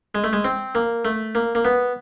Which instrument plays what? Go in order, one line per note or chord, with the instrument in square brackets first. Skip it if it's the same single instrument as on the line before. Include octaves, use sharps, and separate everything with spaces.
[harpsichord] G#3
A3
G#3
C4
A#3
A3
A#3
A#3
B3